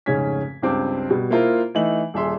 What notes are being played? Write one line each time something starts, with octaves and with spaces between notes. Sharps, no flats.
F1 G#2 C#3 C#4 G#6 B6
C#2 G2 C4 D6
B2 G3
A#3 E4 F4 A#4 C5
E3 A3 D#4 F#7
D#1 G#4 E5 C6